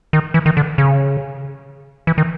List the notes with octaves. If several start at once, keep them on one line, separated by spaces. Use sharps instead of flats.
D#3
E3
D#3
D3
C#3
E3
D#3